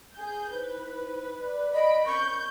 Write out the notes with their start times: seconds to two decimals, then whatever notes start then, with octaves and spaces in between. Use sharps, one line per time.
0.15 G#4 G6
0.52 D#4 E4 B4 C5
1.42 D5
1.74 D#5 B5 D7
2.06 C4 C#4 A#4 C#6 G6